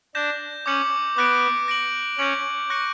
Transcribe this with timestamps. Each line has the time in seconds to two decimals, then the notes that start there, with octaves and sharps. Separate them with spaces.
0.15 D4 G6 A#6 E7
0.66 C#4 D6 G6 C#7 F#7
1.16 B3 D6 F#6 A#6 D7
1.68 A#6 D7 F#7
2.18 C#4 G6 A#6 D7 F#7
2.70 C#6 F#6 A#6 C#7